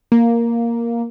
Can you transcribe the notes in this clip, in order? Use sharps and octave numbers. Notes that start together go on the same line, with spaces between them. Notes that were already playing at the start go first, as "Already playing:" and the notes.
A#3